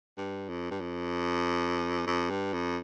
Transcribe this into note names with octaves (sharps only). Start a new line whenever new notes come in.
G2
F2
G2
F2
F2
G2
F2